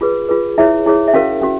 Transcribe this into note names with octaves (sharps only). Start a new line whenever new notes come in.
F4 G#4 B4
F4 G#4 B4
E4 G#4 C#5 E5
E4 G#4 C#5
E5
C#4 F#4 A#4 F5
C#4 F#4